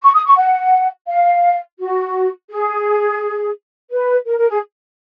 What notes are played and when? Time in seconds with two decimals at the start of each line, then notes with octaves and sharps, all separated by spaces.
0.03 C#6
0.14 D#6
0.26 C#6
0.37 F#5
1.08 F5
1.79 F#4
2.50 G#4
3.91 B4
4.26 A#4
4.38 A#4
4.50 G#4